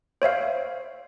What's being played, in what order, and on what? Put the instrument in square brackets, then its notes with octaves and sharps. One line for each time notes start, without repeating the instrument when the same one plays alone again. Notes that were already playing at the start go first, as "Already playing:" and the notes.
[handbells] C5 C#5 E5 F5